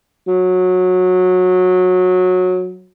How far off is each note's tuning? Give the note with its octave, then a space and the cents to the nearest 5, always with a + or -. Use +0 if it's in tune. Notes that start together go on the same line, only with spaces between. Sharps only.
F#3 -20